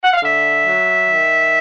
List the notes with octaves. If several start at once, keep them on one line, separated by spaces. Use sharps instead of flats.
F#5
F5
D3 E5
F#3
D#3